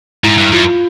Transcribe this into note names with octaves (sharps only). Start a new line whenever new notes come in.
G#2 E4
G2
F#2 F4